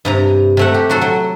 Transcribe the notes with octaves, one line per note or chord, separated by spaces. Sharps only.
G2 C3 A#5
C3 A3 F#5
G4
F#3 F#4 A4
F#3